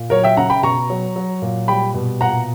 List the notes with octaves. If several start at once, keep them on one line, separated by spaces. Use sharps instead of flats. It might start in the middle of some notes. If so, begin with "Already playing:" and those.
Already playing: A#2
F#3 A#4 C#5
E5 G5
C#3 F#5 A#5
G5 B5
B2 A#5 C#6
F#3
F#3
A#2
G3 G5 B5
B2
A#2 F#5 A#5